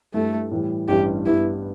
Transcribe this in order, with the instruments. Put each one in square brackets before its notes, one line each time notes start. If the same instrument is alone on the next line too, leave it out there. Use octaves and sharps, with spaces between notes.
[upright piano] G2 G3 E4 A4 [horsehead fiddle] A3
[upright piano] A2 E3 G3
[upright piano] A1 G2 E3 G3 E4 [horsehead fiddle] G4
[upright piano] G2 G3 B3 G4 [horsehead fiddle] E4